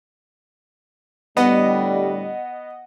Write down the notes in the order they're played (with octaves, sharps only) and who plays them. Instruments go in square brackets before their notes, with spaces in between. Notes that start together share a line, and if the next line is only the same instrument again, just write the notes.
[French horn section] A2 D3 G3 [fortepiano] B3 [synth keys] D#5 F#5